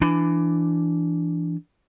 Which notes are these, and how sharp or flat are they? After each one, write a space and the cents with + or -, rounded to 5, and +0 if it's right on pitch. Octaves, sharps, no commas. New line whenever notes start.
E3 +20 D4 +0